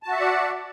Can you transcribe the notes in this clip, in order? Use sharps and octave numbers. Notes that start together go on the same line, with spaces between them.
F#4 D5 E5 F#5 A5